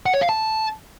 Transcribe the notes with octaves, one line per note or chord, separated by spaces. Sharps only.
F#5
C#5
F5
A5